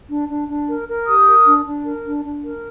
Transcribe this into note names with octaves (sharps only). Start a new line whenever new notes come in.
D4
D4
D4
A#4
A#4
G4 D#6
A#4
D4
D4
A#4
D4
D4
A#4